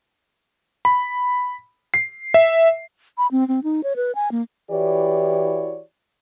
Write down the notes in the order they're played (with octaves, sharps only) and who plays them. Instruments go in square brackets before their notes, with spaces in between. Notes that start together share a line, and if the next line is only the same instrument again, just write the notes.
[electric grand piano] B5
C7
E5
[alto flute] B5
C4
C4
D#4
C#5
B4
G#5
A#3
[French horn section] E3 E4 F#4 G4 C#5 D5